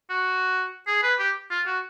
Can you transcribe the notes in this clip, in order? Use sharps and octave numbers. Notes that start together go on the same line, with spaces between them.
F#4
G#4
B4
G4
F4
F#4